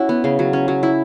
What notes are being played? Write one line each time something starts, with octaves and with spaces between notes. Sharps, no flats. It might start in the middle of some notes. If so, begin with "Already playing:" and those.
Already playing: C#4 E4 F#4
B3
C#3
F#3
C#4
F#3
E4